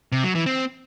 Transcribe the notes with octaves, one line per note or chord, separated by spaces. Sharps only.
C3
F#3
E3
C4